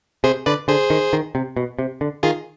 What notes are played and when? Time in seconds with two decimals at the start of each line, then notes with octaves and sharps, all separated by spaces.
0.24 C3 G#4 C5
0.46 D3 B4 D5
0.68 D3 G#4 C5
0.90 D#3
1.13 D#3
1.35 C3
1.57 B2
1.79 C3
2.01 D3
2.23 D#3 F4 G#4